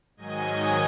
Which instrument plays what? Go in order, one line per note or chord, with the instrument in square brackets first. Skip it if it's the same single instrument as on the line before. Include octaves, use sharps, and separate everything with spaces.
[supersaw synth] G#2 D#3 F#3 D#5 G#5